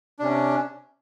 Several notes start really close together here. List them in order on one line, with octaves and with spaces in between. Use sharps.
D4 C3 C#4